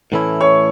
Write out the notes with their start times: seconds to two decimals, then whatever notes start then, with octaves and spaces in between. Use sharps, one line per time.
0.12 A2 E3 A3 C#4 E4
0.41 C#5 C#6